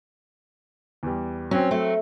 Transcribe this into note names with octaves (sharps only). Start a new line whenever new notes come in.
E2 G3
F#3 C4 C#4
A3